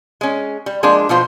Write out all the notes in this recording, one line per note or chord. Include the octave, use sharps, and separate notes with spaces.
G#3 C#4
G3
F3 G#3 A#3 D4
B2 F3 F4 C5